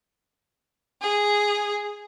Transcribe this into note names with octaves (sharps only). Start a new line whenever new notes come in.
G#4